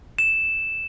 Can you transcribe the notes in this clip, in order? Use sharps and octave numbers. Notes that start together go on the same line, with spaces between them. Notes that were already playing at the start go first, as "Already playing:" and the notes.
E7